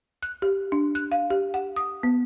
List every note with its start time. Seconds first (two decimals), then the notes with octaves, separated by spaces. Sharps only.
0.23 F#6
0.42 G4
0.72 D4
0.95 F#6
1.12 F5
1.30 G4
1.54 F#5
1.76 D#6
2.03 B3